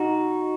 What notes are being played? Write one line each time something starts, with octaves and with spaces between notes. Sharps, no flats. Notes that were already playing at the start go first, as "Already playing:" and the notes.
Already playing: D#4 F#4